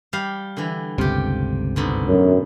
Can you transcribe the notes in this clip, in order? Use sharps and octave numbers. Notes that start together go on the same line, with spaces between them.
G3 G4 F5
D3 E3
G1 C#2 C3 F4 G4
G#2 B2 D3
F#2